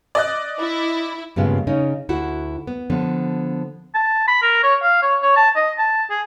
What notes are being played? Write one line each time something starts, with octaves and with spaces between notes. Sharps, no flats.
D5 D#5 F#6
E4
G2 A#2 C#3 G#3 B3
C#3 C#4 D#4
D2 E4 F#4 F#5
B3
D3 F3 B3
A5
B5
A#4
C#5
F5
C#5
C#5
A5
D#5
A5
G#4